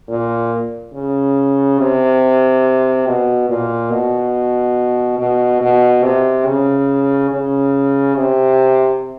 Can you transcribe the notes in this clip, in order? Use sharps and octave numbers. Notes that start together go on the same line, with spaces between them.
A#2
C#3
C3
B2
A#2
B2
B2
B2
C3
C#3
C#3
C3